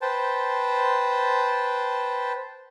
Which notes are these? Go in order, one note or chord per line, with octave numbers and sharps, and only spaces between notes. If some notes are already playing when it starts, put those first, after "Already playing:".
B4 C5 G5 A5